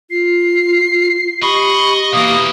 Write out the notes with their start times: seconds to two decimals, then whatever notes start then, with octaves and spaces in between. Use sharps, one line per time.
0.11 F4 C7
1.42 G4 D#5 B5 C#6
2.13 B2 E3 A#3 D#6